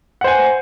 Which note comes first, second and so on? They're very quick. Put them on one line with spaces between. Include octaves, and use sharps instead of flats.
F#5 C5 G#5